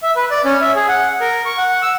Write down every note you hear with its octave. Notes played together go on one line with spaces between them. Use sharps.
E5
B4
D5
C#4
E5
G#4
F#5
A#4
C#6
F#5
E6